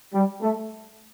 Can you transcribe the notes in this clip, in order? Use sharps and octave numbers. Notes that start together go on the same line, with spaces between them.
G3
A3